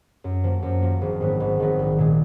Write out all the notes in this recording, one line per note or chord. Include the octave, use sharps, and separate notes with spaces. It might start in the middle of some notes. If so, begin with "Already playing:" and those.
F#2
F3 A#3
F#2
F3 A#3
G#1
G#2 D#3 F#3 B3
G#1
G#2 D#3 F#3 B3
A#1
A#2 G#3